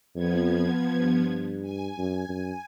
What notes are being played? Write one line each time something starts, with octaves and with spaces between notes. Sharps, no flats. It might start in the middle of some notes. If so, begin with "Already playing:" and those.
F2 F3 B3 G#6
G2
G#5
F#2
F#2